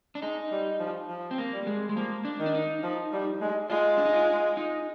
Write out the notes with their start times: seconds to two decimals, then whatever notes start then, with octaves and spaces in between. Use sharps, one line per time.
0.15 D4
0.22 G#3 D#4
0.51 G3
0.80 F3
1.09 F3
1.31 C4
1.38 A#3
1.53 G3
1.67 G#3
1.89 G#3
1.96 F3 A#3
2.25 D4
2.40 D#3
2.46 D4
2.55 D#4
2.84 F3
3.13 G3
3.41 G#3
3.70 G#3 F4
3.98 D4
4.05 D#4
4.13 F4
4.57 D#4